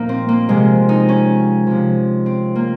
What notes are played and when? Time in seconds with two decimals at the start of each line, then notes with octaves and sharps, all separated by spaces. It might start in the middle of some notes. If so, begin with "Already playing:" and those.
Already playing: A#2 F3 A#3 D#4
0.09 C4
0.29 A#3
0.49 C3 F3 G#3
0.89 D#4
1.09 C#4
1.67 C3 F3
2.26 C4
2.55 A#3